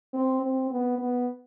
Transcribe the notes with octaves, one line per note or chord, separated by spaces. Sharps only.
C4
C4
B3
B3